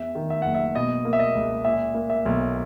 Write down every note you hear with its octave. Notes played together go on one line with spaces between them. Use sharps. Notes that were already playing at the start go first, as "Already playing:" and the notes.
Already playing: E2 E5
D#3
E5
F#1 F#5
E5
B2 D#5
A#3
E5
D#5
C#2
A#2 E5
A#3
E5
B1